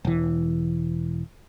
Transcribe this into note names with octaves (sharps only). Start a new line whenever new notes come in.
E1 E3